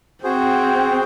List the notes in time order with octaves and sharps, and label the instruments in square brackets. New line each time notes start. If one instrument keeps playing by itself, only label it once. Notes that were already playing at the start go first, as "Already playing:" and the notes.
[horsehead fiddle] C4 [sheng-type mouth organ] F#4 G#4 C5